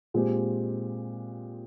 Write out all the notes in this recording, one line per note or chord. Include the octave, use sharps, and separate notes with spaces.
A#2 G#3 C4 G4